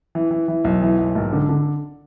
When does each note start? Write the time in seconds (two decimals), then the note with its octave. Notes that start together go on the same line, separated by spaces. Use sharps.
0.15 E3
0.31 E3
0.48 E3
0.64 B1
0.82 E3
0.98 B1
1.15 G#1
1.33 D3
1.49 D3